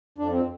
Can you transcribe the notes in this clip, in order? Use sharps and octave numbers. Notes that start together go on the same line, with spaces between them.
F2 D4
C4